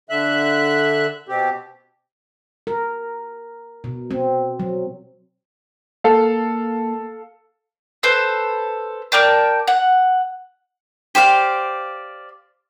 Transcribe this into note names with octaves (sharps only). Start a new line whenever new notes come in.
D3 E5 F#6
B2 C4 G4
A#4
B2
C4
F#3
A#3 A4 F5
A4 B4 C5
A#4 D5 G5 A5
F#5
G4 C5 D5 F5